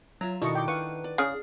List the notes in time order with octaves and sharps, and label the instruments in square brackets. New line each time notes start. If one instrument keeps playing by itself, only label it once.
[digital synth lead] F#3 [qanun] F4 E5 A#5
[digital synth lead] B2 [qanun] D#3 D4 A4 [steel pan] E4 D#5 C#6
[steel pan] G5 D6
[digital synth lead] B4 [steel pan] F5 C#6 [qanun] F#5
[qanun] D5
[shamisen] C#3 [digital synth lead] G#4